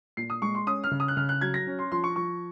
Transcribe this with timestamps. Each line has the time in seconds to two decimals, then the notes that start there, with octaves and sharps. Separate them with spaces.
0.17 A#2 C7
0.30 D#6
0.42 G#3 C#6
0.55 C6
0.67 C#4 D#6
0.84 F6
0.91 C#3
1.00 D#6
1.08 F#6
1.17 C#3 F6
1.29 F#6
1.41 F#3 G#6
1.54 A#6
1.67 C#4
1.79 C6
1.92 F3 C6
2.04 C#6
2.16 F3 C#6